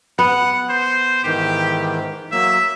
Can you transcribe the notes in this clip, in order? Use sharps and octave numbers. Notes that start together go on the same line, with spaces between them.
B3 F#5
C5
G#2 D#3 E3 G4
F#3 A#3 E5